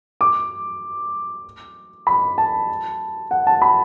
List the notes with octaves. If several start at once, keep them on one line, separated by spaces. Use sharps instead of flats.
D6
B5
A5
F#5
A5
B5